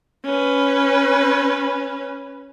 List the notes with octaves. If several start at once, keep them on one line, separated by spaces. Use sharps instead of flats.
C#4 B4